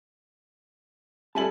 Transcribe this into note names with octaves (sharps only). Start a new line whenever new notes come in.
G3 A4 E5 G#5 A5 F#7